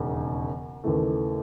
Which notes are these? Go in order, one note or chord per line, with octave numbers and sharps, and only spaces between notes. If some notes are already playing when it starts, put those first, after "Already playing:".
Already playing: E1 D#2 C#3
D#2 C#3 E3 A3